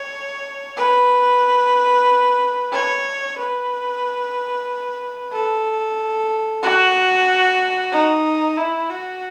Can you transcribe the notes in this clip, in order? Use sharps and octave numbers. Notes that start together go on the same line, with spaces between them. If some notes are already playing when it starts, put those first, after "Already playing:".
Already playing: C#5
B4
C#5
B4
A4
F#4
D#4
E4
F#4